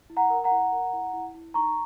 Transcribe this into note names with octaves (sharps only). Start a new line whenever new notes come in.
E4
F#5 A#5
A#4
F#5 A#5
E4
A#4
E4
E4
E4
D#4 A#5 C#6